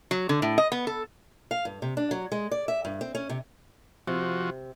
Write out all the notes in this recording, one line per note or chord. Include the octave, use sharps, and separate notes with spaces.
F#3
D3
A2
D#5
B3
A4
F5
G2
C3
D4
F#3
G#3
D5
E5
G2
C4
C#4
C3
C3 F3 F#4